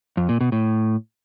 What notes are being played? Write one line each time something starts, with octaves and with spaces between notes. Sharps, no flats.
F2
A#2
B2
A2